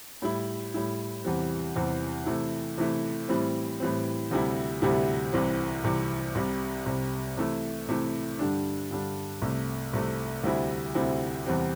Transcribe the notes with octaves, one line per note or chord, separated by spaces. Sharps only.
A2 G3 E4
A2 G3 E4
E2 C3 E3 G3 C4
E2 C3 E3 G3 C4
C3 E3 A3 E4
C3 E3 A3 E4
A2 E3 G3 C4
A2 E3 G3 C4
D2 C3 G3 E4
D2 C3 G3 E4
C2 C3 E3 C4
C2 C3 E3 C4
C2 C3 G3
C2 C3 G3
C3 E3 A3 E4
C3 E3 A3 E4
G2 D3 G3 D4
G2 D3 G3 D4
C2 C3 A3
C2 C3 A3
D2 C3 G3 C4 E4
D2 C3 G3 C4 E4
E2 C3 G3 C4